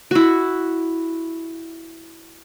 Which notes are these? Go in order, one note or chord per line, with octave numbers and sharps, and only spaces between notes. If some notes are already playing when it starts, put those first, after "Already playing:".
E4 F#4